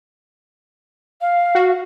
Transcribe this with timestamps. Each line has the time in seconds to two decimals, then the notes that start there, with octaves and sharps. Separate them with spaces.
1.21 F5
1.55 F#4